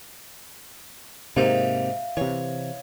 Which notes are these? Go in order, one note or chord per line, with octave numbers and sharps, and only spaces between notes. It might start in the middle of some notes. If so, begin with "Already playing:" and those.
G#2 C3 A#3 D#4 G4 E5 F5
C3 E3 C#5